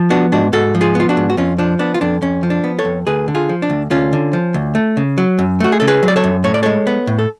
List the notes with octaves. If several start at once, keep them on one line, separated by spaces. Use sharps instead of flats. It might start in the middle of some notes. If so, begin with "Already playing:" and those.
Already playing: F3
B3 D4 F#4
G#2 D4 F#4
G#2 F#4 A4
F3
F4 G#4
B3 F4
D4 F#4
G#2
F#4
F2 C#4 F4
F3 D4
B3 D4
F4
F2 D4
F2 C#4
F3
D4
B3
A4 C#5
F2
D2 G#4 B4
D3
F4 G#4
F3
D4
D2
D2 C#4 F4
D3
F3
D2
A3
C#3
F#3
F#2
A3 F#4
G#4
C#3 A4
G#4 B4
F#3
D5
A4 C#5
F#2
A2 C#5
D5
G#3 A4 C#5
B3
A2
A4